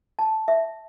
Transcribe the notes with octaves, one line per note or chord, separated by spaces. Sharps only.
A5
E5